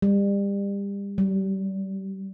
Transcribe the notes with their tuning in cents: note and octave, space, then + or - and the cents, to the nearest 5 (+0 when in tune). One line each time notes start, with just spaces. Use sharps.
G3 +30
G3 -30